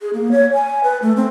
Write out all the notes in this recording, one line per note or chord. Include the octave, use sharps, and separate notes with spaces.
G#4
A#3
C#5
G#5
B4
A3
C4